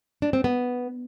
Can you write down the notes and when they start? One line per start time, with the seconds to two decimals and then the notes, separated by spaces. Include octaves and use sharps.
0.22 D4
0.33 C4
0.44 B3